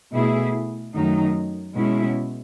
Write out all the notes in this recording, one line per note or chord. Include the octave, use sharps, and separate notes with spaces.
B2 A3 E4 G#4
F#2 D#3 F#3 A3 D#4
B2 G#3 C#4 E4